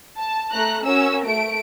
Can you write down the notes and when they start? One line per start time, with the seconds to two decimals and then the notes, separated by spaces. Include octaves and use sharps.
0.18 A5
0.52 A3 A#5 F#6
0.86 C#4 F#4 A#4 E6
1.26 A3 D7